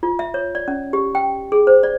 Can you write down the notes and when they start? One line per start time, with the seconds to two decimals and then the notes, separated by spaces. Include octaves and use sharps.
0.03 F4
0.19 E5
0.34 C#5
0.55 D5
0.68 C#4
0.93 G4
1.15 G5
1.52 G#4
1.67 C5
1.83 D5